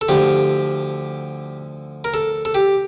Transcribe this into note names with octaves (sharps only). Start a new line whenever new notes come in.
A4
D2 D3 F3 G4
A#4
A4
A4
G4